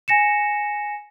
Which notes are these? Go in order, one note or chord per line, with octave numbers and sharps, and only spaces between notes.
G#5 A#6 C#7 E7